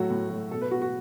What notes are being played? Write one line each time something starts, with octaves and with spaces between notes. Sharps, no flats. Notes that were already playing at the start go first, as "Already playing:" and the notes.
Already playing: A2 F#3 A3 F#4
A2
F#3 A3
B2 A4
B4
B3 F#4
F#4